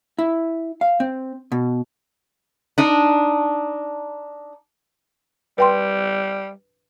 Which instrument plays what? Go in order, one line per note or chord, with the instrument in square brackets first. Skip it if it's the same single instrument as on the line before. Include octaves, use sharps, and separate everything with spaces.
[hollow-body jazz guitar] E4
F5
C4
B2
[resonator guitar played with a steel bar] D4 D#4
[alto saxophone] G3 [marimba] B4 G5 C6